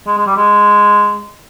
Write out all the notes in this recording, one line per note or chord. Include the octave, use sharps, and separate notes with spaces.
G#3
G#3
G3
G#3